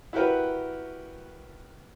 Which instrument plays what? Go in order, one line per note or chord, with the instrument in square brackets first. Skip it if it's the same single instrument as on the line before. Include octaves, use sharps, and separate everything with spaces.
[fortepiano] E4 F#4 G4 A#4 B4